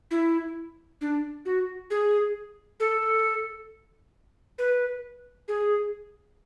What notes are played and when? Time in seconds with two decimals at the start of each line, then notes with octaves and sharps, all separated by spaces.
0.11 E4
1.01 D4
1.45 F#4
1.90 G#4
2.80 A4
4.58 B4
5.48 G#4